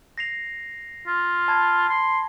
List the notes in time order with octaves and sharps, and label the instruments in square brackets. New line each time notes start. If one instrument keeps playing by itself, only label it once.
[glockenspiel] A#6 C7 F7
[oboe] F4
[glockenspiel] A5 B5 G#6
[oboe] C6